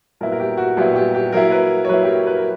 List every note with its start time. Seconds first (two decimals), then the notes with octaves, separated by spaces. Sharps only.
0.21 A#2 F#3 B3 E4 A#4
0.32 A#4
0.40 G4
0.57 F#4
0.77 A#2 F#3 B3 E4 G4
0.96 G4
1.15 G4
1.32 F#3 A#3 E4 A#4
1.51 B4
1.85 C#5
1.89 F#3 A#3 E4 B4
2.03 G4
2.08 A#4
2.27 B4
2.37 A#4